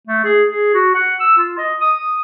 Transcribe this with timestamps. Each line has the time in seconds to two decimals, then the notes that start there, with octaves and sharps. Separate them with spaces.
0.08 A3
0.25 G#4
0.48 G#4
0.74 F#4
0.95 F#5
1.20 E6
1.38 F4
1.58 D#5
1.81 D#6